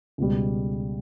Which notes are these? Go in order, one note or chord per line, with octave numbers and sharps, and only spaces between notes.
C#2 B2 G3